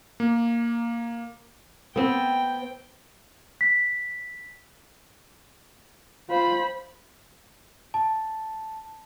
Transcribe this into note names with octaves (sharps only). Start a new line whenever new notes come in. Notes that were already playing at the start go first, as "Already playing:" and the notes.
A#3
B3 C4 G5
B6
F4 C5 B5
A5